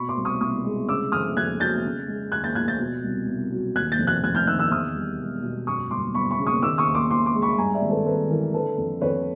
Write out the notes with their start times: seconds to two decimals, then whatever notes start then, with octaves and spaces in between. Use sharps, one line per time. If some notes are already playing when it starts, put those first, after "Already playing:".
Already playing: B2 B5 C#6
0.09 C6 D6
0.17 C2
0.25 C#6 D#6
0.41 C2 C#6 D#6
0.65 G#3
0.88 C#3 D6 E6
1.12 F2 D#6 F6
1.37 F2 F#6 G#6
1.60 F#3 G6 A6
1.84 C#3
2.08 G#3
2.32 D#2 F#6 G#6
2.44 G6 A6
2.55 F3 F#6 G#6
2.68 G6 A6
2.79 B2
3.04 C2
3.27 C2
3.52 F#3
3.75 D#2 F#6 G#6
3.92 G6 A6
3.99 F1
4.07 F#6 G#6
4.23 F1 F#6 G#6
4.35 F6 G6
4.47 D#3 E6 F#6
4.59 E6 F#6
4.71 E2 D#6 F6
4.95 G3
5.19 E1
5.43 B2
5.67 F#2 C#6 D#6
5.91 G1 C6 D6
6.15 G1 B5 C#6
6.31 B5 C#6
6.38 C#3
6.47 C#6 D#6
6.62 D#3 D6 E6
6.78 C#6 D#6
6.87 D#2
6.94 C6 D6
7.10 D#2 C6 D6
7.26 C6 D6
7.34 G#3
7.42 B5 C#6
7.58 G2 G#5 A#5
7.74 D5 E5
7.82 G#1
7.90 A4 B4
8.06 G#1 A4 B4
8.30 E3 A#4
8.54 D3 A4 B4
8.78 F2
9.01 F2 B4 C#5